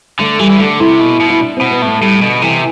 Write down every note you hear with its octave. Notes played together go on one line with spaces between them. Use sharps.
D3 A3
E3 G3
E3
D3 A3
C3 E4
B2
B2
E4
D4
B2 C4
B3
A2 A3
A2 G3
B2 D3
C3 E3